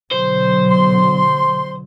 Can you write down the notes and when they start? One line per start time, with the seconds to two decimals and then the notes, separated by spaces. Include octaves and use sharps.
0.11 B2 D3 F#3 C5
0.69 C6